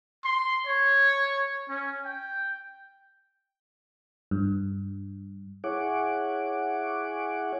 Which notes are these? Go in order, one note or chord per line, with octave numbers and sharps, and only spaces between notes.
C6
C#5
C#4
G5
G2
E4 G#4 C#5 F#5 D6